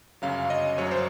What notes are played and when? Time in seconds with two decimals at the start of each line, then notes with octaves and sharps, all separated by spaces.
0.22 G1 F#2 C#3 F#3 F5
0.50 D#5
0.78 G1 F#2 C#3 F#3 C#5
0.91 C5